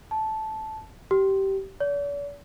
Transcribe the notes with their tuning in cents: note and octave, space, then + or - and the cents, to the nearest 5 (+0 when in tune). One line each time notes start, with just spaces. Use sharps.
A5 -10
G4 -20
D5 -45